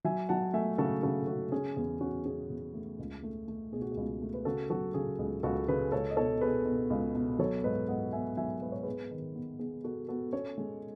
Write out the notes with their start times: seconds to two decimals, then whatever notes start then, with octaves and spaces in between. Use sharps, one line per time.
0.04 F#3 E5 G#5
0.29 F#3 F#5 A5
0.53 A3 E5 G#5
0.78 C#3 F#4 A4
1.03 C#3 F#4 A4
1.27 C#3 F#4
1.52 C#4 G#4
1.76 E2 G#4
2.01 C#4 F#4
2.25 C#4 G#4
2.50 E2
2.74 A3
2.99 C#2
3.23 A3
3.48 A3
3.72 B2 G#4
3.82 F#4
3.91 G#4
3.97 C#2
4.22 A3
4.34 B4
4.45 C#3 F#4 A4
4.70 F#3 F#4 A4
4.94 C#3 G#4
5.18 C#2 G#4
5.43 C#2 F#4 A4
5.68 C#3 G#4 B4
5.92 C#2 A4 C#5
6.10 D#5
6.16 B2 A4 C#5
6.41 B2 G#4 B4
6.65 B2
6.90 C#2
7.15 B2
7.39 F#3 A4 C#5
7.64 G#2 B4 D#5
7.88 G#2 D#5 F#5
8.13 B3 E5 G#5
8.37 F#3 E5 G#5
8.62 G#2 B4
8.72 C#5
8.83 B3 G#4 B4
9.11 D#3
9.35 B3
9.59 B3 G#4
9.84 B3 F#4 A4
10.09 B3 F#4 A4
10.33 C#4 A4 C#5
10.58 G#3